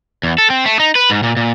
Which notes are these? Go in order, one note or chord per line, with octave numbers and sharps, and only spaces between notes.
E2
A4
C4
A3
D#4
B4
G#2
A#2
A#2